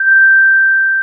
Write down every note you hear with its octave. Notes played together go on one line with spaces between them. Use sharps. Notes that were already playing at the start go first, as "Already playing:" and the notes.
Already playing: G6